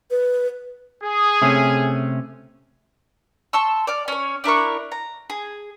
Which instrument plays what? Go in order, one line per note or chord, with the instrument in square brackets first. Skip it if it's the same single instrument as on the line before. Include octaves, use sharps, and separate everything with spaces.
[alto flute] B4
[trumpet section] G#4
[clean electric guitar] C3 A3 C#4
[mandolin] A5 C6 C#6 E6
D5 F6
C#4 C#5
D4 E4 A#4 C#6
A#5
G#4